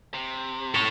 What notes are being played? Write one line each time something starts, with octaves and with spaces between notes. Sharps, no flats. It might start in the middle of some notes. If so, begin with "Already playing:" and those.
C3
A4 C#5